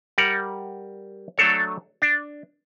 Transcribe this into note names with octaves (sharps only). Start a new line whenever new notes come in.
G3 A#4 F#5
F#3 A3 D4 A4 C#5
D4